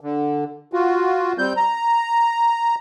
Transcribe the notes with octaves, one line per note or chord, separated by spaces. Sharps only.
D3
F4 F#4
G3 C4 G6
A#5